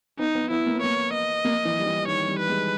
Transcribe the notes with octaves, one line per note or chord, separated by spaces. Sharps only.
B3 D#4
B3
B3 E4
A#3
B3
A#3 C#5
D#5
A#3
E3
G3
E3
D#3 C#5
G3
B4
G#3